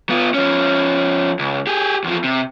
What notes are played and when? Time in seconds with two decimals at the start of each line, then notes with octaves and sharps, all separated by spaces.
0.10 B3 F4
0.34 F3 C#4
1.39 C#2
1.67 G4 G#4
2.04 E2 F3
2.24 C3